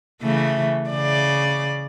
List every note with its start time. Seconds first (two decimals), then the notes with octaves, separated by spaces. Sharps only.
0.21 C#3 E3 A3
0.90 C#3 D5